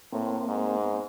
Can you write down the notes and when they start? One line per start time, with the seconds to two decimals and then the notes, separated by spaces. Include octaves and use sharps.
0.12 A2 A#3 C4
0.48 G#2
0.84 B3
0.92 C4